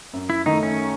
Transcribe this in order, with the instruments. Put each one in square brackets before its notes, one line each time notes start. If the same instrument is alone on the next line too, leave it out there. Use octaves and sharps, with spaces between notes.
[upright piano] F#2
[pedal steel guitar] E4
[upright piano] D#3 A3 [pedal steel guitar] D#4
[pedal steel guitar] C#4